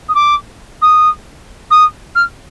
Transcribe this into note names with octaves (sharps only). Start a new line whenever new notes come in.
D#6
D6
D#6
D#6
F6